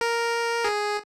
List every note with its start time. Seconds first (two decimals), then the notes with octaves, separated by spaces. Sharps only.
0.01 A#4
0.65 G#4